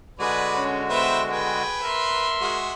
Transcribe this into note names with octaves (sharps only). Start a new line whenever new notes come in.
D3 G#3 F#4 G#4 B4 D5
C#4
B3 B4 C5 E5 G5
G#4 B4 G5
A#4 E5 C6
G#3 F#4